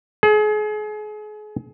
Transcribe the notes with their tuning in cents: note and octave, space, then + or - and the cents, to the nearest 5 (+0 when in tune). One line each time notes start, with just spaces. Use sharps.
G#4 +35